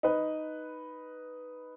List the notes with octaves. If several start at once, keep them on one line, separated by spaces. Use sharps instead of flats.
D#4 B4